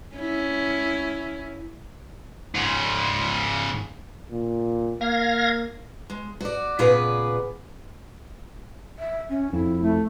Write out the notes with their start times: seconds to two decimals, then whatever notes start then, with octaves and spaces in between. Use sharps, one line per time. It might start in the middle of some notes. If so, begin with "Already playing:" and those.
0.15 C#4 E4
2.55 G#2 C#3
4.31 A#2
5.01 A#3 F5 G#6 A#6
6.10 G#3
6.41 F#4 D5
6.79 A#2 C#3 B3 G#4 B4 D5
8.99 E5
9.29 C#4
9.53 F2 E4
9.80 A3